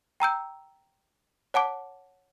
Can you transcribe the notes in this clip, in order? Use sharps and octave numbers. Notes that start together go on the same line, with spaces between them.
G5 A#5 E6 G6
C#5 F#5 A5 D6